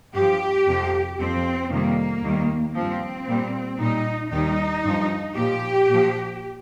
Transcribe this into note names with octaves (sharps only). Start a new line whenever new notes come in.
G2 F3 G4
F2 C3 F3
F2 F3 C4
F2 C3 D#3 G3 A#3
D#2 D#3 G3
F3 C4
G2
A#2 G3
A#2 G3 D#4
D#2 D#3 G3 D#4
G2 F3
A#2 F3 G4
A#2 F3